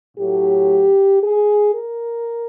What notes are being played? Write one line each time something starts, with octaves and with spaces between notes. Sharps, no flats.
A2 F#3 A3 G4
G#4
A#4